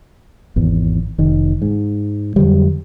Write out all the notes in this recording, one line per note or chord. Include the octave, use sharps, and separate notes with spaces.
G#1 E2
F1 D#3
G#2
F2 D3 F#3 G3